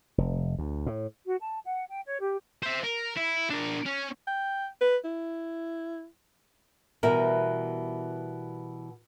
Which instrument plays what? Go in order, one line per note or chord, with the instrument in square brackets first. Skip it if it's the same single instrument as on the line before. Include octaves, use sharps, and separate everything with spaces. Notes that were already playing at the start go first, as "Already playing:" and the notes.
[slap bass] F1
D2
A2
[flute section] F#4
A5
F#5
G5
C#5
G4
[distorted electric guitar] C5 E5
A#4
E4
D4 A#4
C#4
[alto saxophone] G5
B4
E4
[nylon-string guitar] B2 E3 G3 E4 A#4